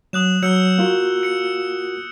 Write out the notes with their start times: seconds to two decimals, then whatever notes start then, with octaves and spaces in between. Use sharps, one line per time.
0.13 F#3 D#6 F#6 E7
0.43 F#3 E6 G6 C#7
0.78 A#3 F4 F#4
1.23 C#7